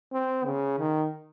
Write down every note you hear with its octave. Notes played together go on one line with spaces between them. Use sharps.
C4
C#3
D#3